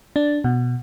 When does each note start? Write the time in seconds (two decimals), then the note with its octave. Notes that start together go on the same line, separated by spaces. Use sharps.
0.16 D4
0.44 B2